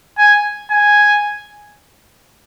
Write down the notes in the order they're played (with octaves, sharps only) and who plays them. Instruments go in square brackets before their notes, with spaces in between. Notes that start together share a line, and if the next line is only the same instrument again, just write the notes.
[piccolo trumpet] G#5
G#5